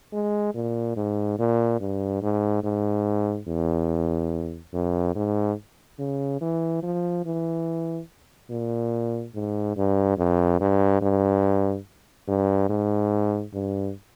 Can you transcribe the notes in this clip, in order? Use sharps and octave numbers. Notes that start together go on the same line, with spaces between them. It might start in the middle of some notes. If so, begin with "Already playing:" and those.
G#3
A#2
G#2
A#2
G2
G#2
G#2
E2
F2
G#2
C#3
E3
F3
E3
A#2
G#2
G2
F2
G2
G2
G2
G#2
G2